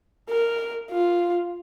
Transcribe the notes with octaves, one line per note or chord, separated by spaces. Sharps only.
A#4
F4